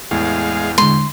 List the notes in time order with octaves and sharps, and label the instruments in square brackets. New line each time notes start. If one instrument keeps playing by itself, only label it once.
[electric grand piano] E2 A2 [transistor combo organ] G#3 F5
[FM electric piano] D3 G#3 [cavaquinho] C6